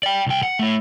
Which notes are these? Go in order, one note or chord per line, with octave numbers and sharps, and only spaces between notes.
D5 G5
C2 G5
F#5
A3 E4